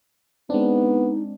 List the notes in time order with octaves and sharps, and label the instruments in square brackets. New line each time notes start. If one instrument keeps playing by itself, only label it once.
[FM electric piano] G#3 C4 D4 [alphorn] B3 [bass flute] D#4